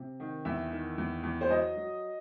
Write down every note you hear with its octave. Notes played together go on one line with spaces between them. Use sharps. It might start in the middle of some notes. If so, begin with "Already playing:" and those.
Already playing: C3
D#3
E2 E5
D#3
E2
E2
C5
F#3 D#5
F#3